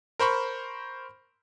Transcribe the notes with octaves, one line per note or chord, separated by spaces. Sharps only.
A#4 C5 B5 C#6